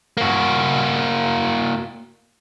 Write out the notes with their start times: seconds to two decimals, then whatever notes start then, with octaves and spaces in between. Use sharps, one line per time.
0.17 A#3 F#4